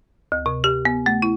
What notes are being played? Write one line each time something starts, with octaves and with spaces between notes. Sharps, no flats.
D2
C3
G4
B3
A3
E4